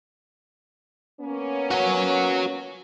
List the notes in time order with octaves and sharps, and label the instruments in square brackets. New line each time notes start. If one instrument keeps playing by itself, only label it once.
[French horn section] A#3 B3 C#4
[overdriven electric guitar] F#4 C#5